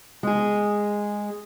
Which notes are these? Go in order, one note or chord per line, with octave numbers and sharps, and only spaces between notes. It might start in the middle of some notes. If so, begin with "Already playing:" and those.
G#3 G#4